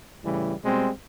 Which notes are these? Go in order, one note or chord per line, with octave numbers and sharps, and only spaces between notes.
A2 C#3 E3 G3
B2 G3 G#3 C4